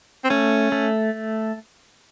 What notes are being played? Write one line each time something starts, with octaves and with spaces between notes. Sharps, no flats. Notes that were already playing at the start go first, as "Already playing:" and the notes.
C4
A3 C#4
A3